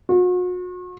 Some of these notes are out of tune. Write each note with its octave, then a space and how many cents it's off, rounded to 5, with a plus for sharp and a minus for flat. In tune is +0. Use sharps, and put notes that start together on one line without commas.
F#4 -40